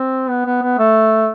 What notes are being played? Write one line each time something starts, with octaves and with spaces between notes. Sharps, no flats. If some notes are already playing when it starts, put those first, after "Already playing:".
Already playing: C4
B3
B3
B3
A3